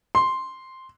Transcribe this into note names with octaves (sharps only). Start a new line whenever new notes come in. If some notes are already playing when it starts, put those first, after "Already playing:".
C6